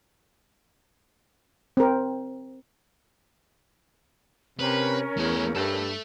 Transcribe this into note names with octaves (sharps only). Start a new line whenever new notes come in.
C4 A#4
C3 C#4 A#4 B4
E2 A3 G#5
G2 A4 E5